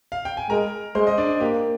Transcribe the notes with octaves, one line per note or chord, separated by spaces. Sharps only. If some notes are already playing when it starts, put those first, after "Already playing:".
F5
G5
G#5
G#3 A#4 A#5
G#3 C5 C6
D#5
D4 D5
A#3 G4